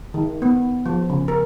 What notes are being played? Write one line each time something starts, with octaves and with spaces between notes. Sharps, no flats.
D#3
B3
F3
C#3
A#4